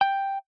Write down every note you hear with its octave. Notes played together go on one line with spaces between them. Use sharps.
G5